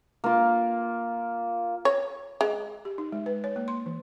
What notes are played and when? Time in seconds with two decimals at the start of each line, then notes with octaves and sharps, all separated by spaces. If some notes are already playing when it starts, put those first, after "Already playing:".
0.24 A#3 F4
1.85 C#5
2.41 G#3
2.85 G4
2.98 D#4
3.12 G#3
3.26 B4
3.44 C#5
3.56 A#3
3.68 C6
3.86 E3